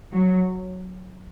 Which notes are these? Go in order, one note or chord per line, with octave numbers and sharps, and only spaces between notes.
F#3